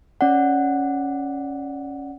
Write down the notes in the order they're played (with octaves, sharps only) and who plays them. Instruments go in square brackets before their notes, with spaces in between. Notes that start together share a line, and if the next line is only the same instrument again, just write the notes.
[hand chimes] C#4 D5 F#5